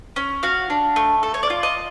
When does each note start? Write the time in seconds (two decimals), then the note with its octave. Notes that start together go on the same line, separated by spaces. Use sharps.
0.16 C#4
0.43 F#4 F5
0.70 D4
0.96 A3
1.23 A4
1.34 C#5
1.43 D5
1.50 F4
1.63 D#5